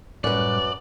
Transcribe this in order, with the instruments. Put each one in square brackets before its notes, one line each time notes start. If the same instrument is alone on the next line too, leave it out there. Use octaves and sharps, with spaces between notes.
[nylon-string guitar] F#2 B4 [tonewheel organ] A2 G3 F#6 [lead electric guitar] D5